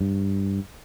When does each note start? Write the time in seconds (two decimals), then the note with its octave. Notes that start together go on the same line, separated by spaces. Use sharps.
0.01 G2